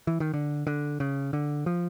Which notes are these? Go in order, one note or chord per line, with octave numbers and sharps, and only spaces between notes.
E3
D#3
D3
D3
C#3
D3
F3